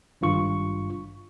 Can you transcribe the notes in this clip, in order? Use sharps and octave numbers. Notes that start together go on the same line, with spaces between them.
G#1 G2 F4 C#6